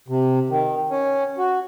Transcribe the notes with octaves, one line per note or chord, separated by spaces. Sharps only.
C3
D#3
C#4
F#4